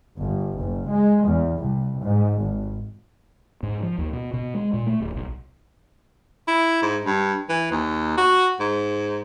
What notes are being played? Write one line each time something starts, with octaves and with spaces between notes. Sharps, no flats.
G1
F#1
G#3
E2
C2
G#2
G#1
G#2
F3
D#2
B2
B2
G#3
A#2
A3
D1
B1
E4
G#2
G2
E3
D#2
F#4
G#2